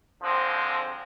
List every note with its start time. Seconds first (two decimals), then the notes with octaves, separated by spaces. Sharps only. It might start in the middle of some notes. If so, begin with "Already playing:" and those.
0.22 G#1 D3 F3 G#3 C4 C5